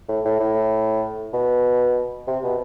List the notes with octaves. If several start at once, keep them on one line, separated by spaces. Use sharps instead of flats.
A2
A2
A2
B2
C3
B2